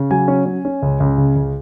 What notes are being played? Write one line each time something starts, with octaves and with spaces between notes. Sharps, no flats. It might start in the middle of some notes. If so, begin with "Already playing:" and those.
Already playing: C#3
F#3 G#5
C#4
C#4
C#4
C#2
C#2
C#3
C#2